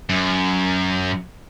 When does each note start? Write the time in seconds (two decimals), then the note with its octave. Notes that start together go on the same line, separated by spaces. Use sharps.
0.10 F#2